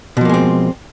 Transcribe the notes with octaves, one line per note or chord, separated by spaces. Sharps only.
B2 F3 G#3 A#3 C4